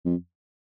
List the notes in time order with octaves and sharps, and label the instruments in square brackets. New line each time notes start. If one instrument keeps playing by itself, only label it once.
[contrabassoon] F2